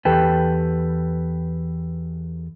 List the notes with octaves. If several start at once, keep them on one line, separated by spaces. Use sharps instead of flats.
E2 G4 A4 B4 G5 A5